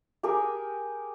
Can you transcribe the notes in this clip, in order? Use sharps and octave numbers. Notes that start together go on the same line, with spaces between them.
G4 G#4 A#4 G#5